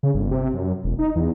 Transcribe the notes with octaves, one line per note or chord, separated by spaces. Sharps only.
C#3
G1
C3
F#2
E1
D#4
E2